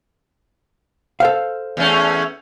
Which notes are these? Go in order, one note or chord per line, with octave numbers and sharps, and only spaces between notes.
A4 C5 F5
E2 A3 C#4